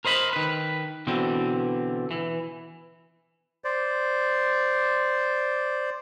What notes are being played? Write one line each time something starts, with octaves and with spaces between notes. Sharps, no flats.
A#4 C5 D#5 B5
D#3 B4
B2 D3 E3 C4
E3
C5 D5